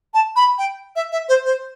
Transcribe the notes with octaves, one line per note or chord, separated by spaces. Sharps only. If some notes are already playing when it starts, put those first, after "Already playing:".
A5
B5
G5
E5
E5
C5
C5